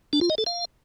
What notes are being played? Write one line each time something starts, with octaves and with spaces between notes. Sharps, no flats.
D4
F4
D#5
A4
F5